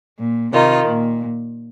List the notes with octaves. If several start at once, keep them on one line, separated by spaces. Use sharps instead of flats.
A#2
C3 D#3 D#4 F4
A#2